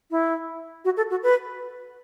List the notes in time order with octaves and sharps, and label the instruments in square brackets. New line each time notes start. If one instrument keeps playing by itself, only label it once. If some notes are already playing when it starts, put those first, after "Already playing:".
[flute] E4
F#4
A4
F#4
B4